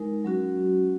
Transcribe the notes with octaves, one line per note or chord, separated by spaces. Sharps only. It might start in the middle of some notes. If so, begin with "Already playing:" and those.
Already playing: G#3 D#4 A#4
F#3 C#4 F#4